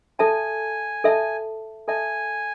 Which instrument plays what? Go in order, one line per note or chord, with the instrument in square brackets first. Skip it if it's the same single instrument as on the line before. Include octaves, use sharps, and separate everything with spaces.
[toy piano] A4 E5 A5 [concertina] G#5
[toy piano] A4 E5 A5
[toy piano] A4 E5 A5 [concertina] G#5